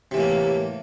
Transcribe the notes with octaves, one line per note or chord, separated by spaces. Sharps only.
A2 C3 E3 A#3